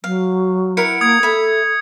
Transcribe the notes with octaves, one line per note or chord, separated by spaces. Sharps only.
F#3 F5
E4 A#4 F#5 C#7
A#3 D#6 G#6
A4 E5 B5